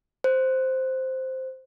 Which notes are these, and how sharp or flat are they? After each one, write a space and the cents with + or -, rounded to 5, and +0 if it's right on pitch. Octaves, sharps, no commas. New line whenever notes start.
C5 +0